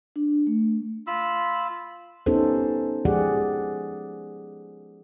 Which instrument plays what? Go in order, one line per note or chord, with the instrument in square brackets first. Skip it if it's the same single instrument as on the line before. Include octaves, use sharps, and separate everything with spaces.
[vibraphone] D4
A3
[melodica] F4 B5 E6
[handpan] B3 C#4 D#4 G4 A4 C5
F3 G#3 G4 G#4 D5 F#5